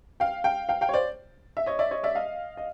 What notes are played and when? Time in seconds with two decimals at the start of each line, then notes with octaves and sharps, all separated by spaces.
0.20 F5 G5
0.44 F5 G5
0.69 F5 G5
0.81 F5 G5
0.89 C#5
0.93 C5 D5
1.57 E5
1.66 C#5 D#5
1.79 D5 E5
1.91 C#5 D#5
2.03 D5 E5
2.15 D#5 F5
2.57 D#5